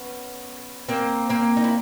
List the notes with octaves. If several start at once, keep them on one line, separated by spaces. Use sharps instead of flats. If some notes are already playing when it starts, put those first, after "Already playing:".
Already playing: B3 C#4
A#3 C4
A#3 C4
D#4
E4